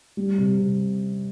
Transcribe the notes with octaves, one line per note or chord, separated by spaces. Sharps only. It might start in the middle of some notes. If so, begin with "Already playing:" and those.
G3
C3
C3